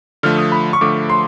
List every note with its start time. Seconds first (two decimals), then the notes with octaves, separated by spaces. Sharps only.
0.23 D3 F3 A3 F6
0.38 D#6
0.52 B5
0.73 C#6
0.81 D3 F3 A3 D6
1.09 C6